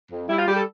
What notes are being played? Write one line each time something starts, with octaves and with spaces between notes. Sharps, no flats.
F2
G3 E4
F4
G3 G4
A4